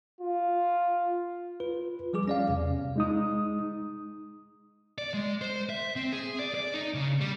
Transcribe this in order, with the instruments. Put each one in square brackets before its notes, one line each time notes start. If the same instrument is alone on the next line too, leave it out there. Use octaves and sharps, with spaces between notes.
[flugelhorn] F4
[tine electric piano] F4 B4
F3 G3 G#4 D6
C#4 D5 F5
E2 C3
[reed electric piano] G#3 D#4 D#6
[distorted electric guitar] D5
G#3
C5
E5
C4
G#4
D5
D5
D#4
C#3
G3